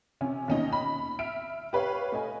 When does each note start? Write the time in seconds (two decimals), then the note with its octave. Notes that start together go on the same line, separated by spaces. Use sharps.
0.21 C3 C#4 G#5
0.48 D#2 B2 C#4 D#4 D#5
0.72 B5
1.19 E5 F6 D7
1.73 G4 B4 C#5 F5
2.12 A3 D#5 G#5